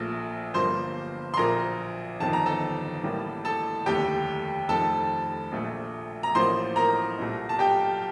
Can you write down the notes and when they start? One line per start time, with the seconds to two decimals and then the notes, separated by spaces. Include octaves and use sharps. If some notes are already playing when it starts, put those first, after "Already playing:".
Already playing: A#1 A#2 A3
0.54 G1 G2 F3 A#3 C5 C6
1.34 C6
1.37 A#1 A#2 F3 A#4 A#5
2.20 G1 F2 D#3 A5
2.33 A#5
2.46 A4 A5
3.03 A1 A2 G3 A#3
3.45 A4 A5
3.86 F1 D#2 D3 A3 G4 G5
4.69 F1 F2 D#3 A4 A5
5.52 A#1 A#2 A3
6.23 A#5
6.35 A1 A2 F3 A#3 C5 C6
6.76 A#4 A#5
7.18 C2 A#2 A3
7.49 A5
7.59 G4 G5